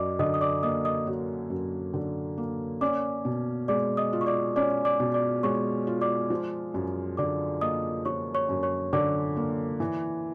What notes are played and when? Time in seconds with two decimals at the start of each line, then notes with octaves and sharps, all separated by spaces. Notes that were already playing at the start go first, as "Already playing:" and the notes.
Already playing: F#2 F#3 D5 D#5 D6
0.19 D3 D#5 D#6
0.34 D#6
0.41 D5 D6
0.63 A#3 D#5 D#6
0.85 D#5 D#6
1.07 F#3
1.50 F#2
1.94 D3
2.38 A#3
2.81 C#4 D5 D6
3.25 B2
3.68 G#3 D5 D6
3.97 D#5 D#6
4.13 F4
4.21 C#6
4.26 D5 D6
4.56 C#4 D5 D6
4.85 D5 D6
5.00 B2
5.14 D5 D6
5.43 G#3 C#5 C#6
5.87 F4
6.01 D5 D6
6.30 F3
6.74 F#2
7.17 D3 D5 D6
7.61 A#3 D#5 D#6
8.05 F3 C#5 C#6
8.35 C#5 C#6
8.49 F#2
8.63 C#5 C#6
8.93 D3 D5 D6
9.37 A#3
9.80 E3